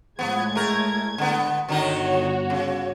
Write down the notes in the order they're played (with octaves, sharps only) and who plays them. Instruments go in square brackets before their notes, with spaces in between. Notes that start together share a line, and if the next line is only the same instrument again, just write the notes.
[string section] A2 G#3 G#6 [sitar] F3 B3
[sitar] A3 A#4
D3 B3
[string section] G1 F#4 C#5 [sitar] D3 D#3 D#4
[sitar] C#3